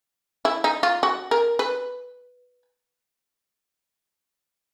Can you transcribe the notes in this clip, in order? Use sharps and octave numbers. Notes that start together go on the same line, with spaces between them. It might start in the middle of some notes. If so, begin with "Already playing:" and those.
E4
D#4
F4
F#4
A#4
B4